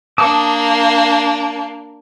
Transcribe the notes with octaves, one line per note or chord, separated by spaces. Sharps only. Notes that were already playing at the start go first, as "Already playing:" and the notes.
A#3 D4 A5 D6 D#6